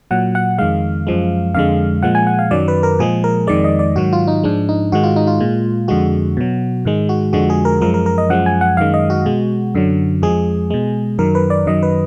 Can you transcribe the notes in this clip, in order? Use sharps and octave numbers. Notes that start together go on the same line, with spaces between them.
A#2 F#3 F#5
F#5
F2 D#3 G#3 F5
F#2 F3 G#3
F2 D3 G#3 F5
A#2 F3 G#3 F#5
G#5
F#5
F5
F#2 D#3 F#3 D5
B4
A#4
A#2 F3 G#3 G#4
A#4
F2 D#3 G#3 D5
D#5
D5
G#2 D#3 F#3 F#4
F4
D#4
G#2 F3 G#3 D4
D#4
G#2 D#3 G#3 F#4
F4
D#4
F4
A#2 G#3
F2 D3 G#3 F#4
B2 F#3
G#2 D#3 G#3
F#4
F2 D3 F3 G#3 F#4
G#4
A#4
F#2 F3 G#3 A#4
A#4
A#4
D#5
F#2 F3 G#3 F#5
G#5
F#5
F#2 D#3 G#3 F5
D#5
F#4
B2 G#3
F#2 D3 F#3
F2 F3 G#3 G#4
B2 G#3
F#2 D#3 F#3 A#4
B4
D5
F#2 D#3 F#3 D#5
B4